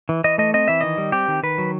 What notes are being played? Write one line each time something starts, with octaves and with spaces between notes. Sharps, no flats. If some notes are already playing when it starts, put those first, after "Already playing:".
E3
E3 D#5
A3 D#5
C4 D#5
E3 E5
D#3 D#5
G3
C4 G4
D#3
D#3 B4
F#3